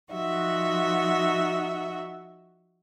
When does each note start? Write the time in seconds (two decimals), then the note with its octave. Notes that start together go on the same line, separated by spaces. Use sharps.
0.12 F3 D#4 F#4 E5 F#5